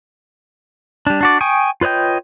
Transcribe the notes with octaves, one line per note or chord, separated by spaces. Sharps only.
G3 D4
D4 F#4 D5
G5 G#5 C#6 D#6
F4 B4 C#5 D#5 G5